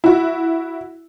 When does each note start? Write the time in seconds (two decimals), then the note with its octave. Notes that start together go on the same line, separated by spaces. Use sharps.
0.04 E4 F#4